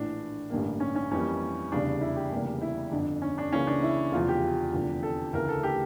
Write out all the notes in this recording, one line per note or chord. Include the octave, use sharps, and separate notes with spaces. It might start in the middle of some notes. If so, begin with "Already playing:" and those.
Already playing: A#1 A2 E3 D4
A1 G2 D3 G3 A#3
C#4
C#4
F2 E3 G3 A#3 C#4
F1 E2 C#3 G3 D4
E4
G4
F1 E2 C#3 G3 A#3
E4
G1 F2 D3 D4
C#4
D4
C#2 C#3 E3 A#3 C#4
D4
E4
F1 E2 C#3 F3 F4
G4
F1 E2 D3 F3
A4
D2 C#3 E3 A3 A#4
A4
G4